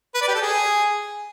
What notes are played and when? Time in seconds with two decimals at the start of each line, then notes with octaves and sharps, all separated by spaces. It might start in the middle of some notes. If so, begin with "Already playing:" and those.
0.15 B4
0.21 D5
0.28 G4
0.35 A4
0.41 G#4